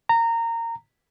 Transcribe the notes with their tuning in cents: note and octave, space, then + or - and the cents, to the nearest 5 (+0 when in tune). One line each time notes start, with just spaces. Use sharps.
A#5 -20